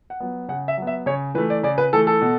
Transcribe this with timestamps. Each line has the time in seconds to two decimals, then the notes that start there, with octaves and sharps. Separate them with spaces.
0.10 F#5
0.20 F#3 B3
0.48 C#3 F#5
0.68 E5
0.77 F#3
0.82 B3
0.87 E5
1.06 C#3 C#5
1.35 E3 B4
1.38 A3
1.50 D5
1.63 C#3 D5
1.78 B4
1.93 E3 A3 A4
2.07 A4
2.22 B2